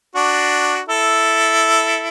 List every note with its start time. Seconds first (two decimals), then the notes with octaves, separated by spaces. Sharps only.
0.15 D4 F#4
0.88 E4 A4